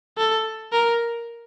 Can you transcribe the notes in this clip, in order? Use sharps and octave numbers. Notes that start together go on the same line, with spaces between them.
A4
A#4